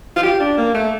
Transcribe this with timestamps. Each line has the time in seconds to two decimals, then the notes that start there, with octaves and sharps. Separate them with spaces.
0.16 F4
0.23 G4
0.40 D4
0.57 A#3
0.74 A3